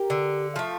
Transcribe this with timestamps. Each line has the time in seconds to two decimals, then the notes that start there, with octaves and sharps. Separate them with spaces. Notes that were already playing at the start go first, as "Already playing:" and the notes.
Already playing: G4 A#4
0.10 D3
0.56 F3 A3